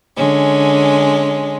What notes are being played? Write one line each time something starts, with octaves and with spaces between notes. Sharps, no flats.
D3 G#3 C#4